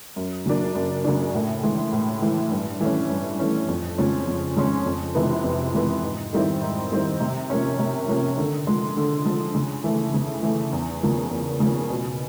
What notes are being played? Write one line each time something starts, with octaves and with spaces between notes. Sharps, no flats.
F#2
C#3 F#3 A#3 D4
F#2
C#3 F#3 A#3 D4
A2
E3 G#3
A2
E3 G#3
G2
E3 A3 C#4
G2
E3 A3 C#4
F2
C#3 F3 G#3 C#4
F2
C#3 F3 G#3 C#4
F2
C3 E3 G#3 B3
F2
C3 E3 G#3 B3
G#2
D#3 G3 C4 E4
G#2
D#3 G3 C4 E4
C3
F3 A#3 C#4
C3
F3 A#3 C#4
D3
F3 G#3
D3
F3 G#3
C#3
E3 A3
C#3
E3 A3
E2
C#3 F3 A#3
E2
C#3 F3 A#3
B2